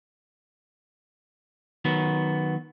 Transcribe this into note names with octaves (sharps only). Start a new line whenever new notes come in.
D#3 F#3 B3